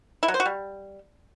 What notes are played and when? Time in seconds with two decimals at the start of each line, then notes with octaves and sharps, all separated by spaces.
0.23 E4
0.28 F#3
0.34 C5
0.40 F#4
0.45 G3